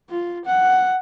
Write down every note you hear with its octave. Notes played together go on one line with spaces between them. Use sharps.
F4
F#5